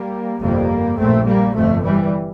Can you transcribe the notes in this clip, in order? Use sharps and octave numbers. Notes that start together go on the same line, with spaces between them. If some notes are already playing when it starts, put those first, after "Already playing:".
Already playing: G3 A#3
G1 F2 C3 G3 A#3
A#1 A#2 A3 C4
G3 A#3
G1 F2 C3 F3 A3
E3 G3